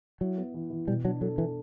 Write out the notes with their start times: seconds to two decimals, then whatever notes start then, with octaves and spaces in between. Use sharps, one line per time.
0.21 F#3 E4
0.38 B3
0.54 E3
0.70 E3
0.87 B2 G3
1.04 F#3 D4
1.21 F#3 A4
1.38 E3 A4